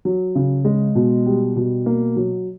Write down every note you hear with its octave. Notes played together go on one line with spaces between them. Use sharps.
F#3
C#3
G#3
B2
G3
B2
A#3
F#3